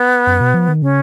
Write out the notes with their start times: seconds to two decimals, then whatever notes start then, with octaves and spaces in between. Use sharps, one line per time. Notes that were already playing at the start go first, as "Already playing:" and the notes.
Already playing: B3
0.27 F#2
0.41 B2
0.54 F3
0.68 D#3
0.82 C#3 C#4